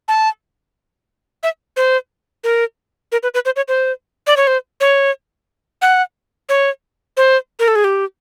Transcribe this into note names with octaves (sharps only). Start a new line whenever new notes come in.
A5
E5
C5
A#4
A#4
B4
B4
C5
C#5
C5
D5
C#5
C5
C#5
F#5
C#5
C5
A#4
A4
G#4
G4